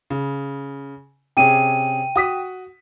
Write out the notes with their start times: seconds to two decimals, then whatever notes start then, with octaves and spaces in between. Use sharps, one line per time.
0.10 C#3
1.37 C3 C#4 G#4 G5 D#7
2.16 F#4 D#6 B6